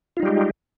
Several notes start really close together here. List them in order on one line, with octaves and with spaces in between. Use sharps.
F4 D#4 G3 G4 G#3